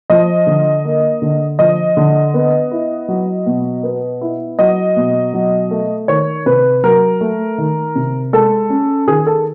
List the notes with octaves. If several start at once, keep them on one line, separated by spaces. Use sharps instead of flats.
F3 D#5
D3
A#3
D3
F3 D#5
D3
B3
E4
F#3
B2
B3
E4
F#3 D#5
B2
F#3
A3
D#3 C#5
C3 B4
F#3 A#4
A3
D#3
C3
G#3 A4
C#4
D#3 G#4
A4